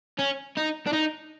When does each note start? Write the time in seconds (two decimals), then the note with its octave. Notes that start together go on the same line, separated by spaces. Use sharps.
0.19 C#4
0.57 D#4
0.87 D4
0.93 D#4